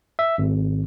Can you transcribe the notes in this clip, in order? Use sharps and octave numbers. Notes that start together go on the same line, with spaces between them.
E5
G#1